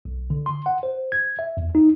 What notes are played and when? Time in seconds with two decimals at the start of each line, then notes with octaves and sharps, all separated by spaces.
0.05 B1
0.30 D3
0.46 C6
0.66 F#5
0.83 C5
1.12 G#6
1.39 E5
1.57 E2
1.75 D#4